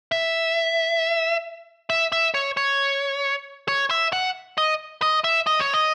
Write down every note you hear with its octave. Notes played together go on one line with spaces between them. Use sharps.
E5
E5
E5
C#5
C#5
C#5
E5
F#5
D#5
D#5
E5
D#5
C#5
D#5